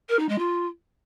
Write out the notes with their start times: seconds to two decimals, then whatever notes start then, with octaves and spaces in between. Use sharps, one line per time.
0.09 A#4
0.19 D#4
0.29 G#3
0.38 F4